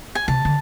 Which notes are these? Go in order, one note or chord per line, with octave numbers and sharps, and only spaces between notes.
G#5
C3 A5
D3